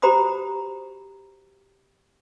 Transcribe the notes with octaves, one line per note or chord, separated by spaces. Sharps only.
F#4 G4 C5 A#5 B5 D#6